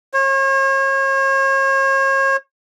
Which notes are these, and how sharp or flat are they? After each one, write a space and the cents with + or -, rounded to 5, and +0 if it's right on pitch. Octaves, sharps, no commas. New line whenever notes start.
C#5 -40